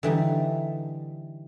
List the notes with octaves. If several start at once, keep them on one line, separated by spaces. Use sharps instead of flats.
D3 E3 G3 D#4